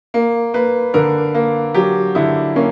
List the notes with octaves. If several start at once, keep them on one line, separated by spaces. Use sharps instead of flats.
A#3
A#3 B4
D3 A#4
A#3
F#3 G4
D3 E4
A#3 C#4